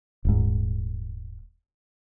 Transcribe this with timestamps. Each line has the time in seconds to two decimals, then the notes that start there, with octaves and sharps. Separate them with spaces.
0.25 D#1 G#2